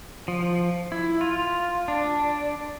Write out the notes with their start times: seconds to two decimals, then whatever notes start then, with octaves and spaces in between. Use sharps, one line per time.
0.28 F3
0.92 E4
1.21 F4
1.88 D4